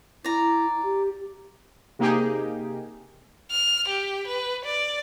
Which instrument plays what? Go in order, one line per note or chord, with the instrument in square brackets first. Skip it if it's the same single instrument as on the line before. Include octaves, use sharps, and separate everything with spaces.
[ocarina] E4 [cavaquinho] D5 A#5
[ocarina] G4
[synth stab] C3 A#3 D#4 G4 G#4
[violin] F6
G4
B4
D5